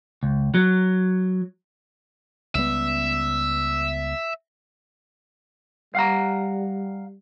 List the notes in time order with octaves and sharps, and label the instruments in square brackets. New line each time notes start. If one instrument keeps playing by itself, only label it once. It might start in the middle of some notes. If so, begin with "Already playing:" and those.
[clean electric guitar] C#2
F#3
[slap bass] C#2 G3 B3 [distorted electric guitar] E5
[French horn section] G3 [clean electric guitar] F5 F#5 A#5